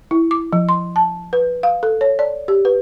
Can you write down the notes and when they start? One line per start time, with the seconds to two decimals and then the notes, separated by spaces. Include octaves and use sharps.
0.11 E4
0.31 D6
0.53 F3
0.69 C6
0.96 A5
1.33 B4
1.63 F5
1.83 A4
2.01 C#5
2.19 D5
2.48 G4
2.65 B4